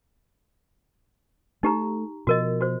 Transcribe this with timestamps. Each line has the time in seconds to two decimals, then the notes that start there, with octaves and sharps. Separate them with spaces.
1.63 A3 D#4 G4 A#5
2.27 B2 F3 F#4 A#4 D#5
2.61 F#4 C5